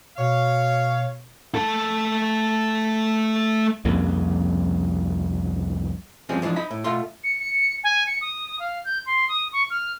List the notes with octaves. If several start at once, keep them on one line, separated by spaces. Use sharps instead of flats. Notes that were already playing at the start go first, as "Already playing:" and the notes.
B2 C#5 F5
A3 A4
C2 F2 C#3 A#3
G2 F3 G#3 C4 C#4
E3 F3 G#3 D4
D#4 D#5 B5
A2
B2 A3 F4 C6
C#7
C#7
G#5
C#7
D#6
F5
G6
C6
D#6
C#6
F6